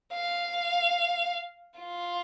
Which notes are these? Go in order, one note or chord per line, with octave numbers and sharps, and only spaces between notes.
F5
F4